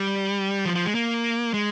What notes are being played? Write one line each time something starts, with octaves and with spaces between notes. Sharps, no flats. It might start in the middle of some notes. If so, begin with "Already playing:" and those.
Already playing: G3
F3
F3
G#3
A#3
G#3